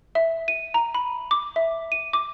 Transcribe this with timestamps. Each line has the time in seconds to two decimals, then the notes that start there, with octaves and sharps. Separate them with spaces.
0.15 E5
0.48 D#7
0.74 A#5
0.95 B5
1.31 D6
1.56 E5
1.92 D#7
2.13 D6